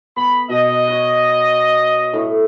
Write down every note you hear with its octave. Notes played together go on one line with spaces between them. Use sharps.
B3 B5
B2 D#5
C#5 F#5
A2